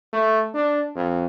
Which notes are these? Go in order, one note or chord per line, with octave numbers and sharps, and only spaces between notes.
A3
D4
F2